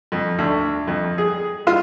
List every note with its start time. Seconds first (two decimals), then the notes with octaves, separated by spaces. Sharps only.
0.12 F2
0.38 D2
0.87 F2
1.18 G#4
1.67 F4